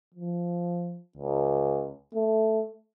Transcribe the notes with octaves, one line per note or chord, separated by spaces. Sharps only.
F3
C#2
A3